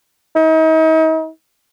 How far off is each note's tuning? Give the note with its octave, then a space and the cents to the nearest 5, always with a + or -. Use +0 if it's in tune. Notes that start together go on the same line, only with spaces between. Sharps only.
D#4 +40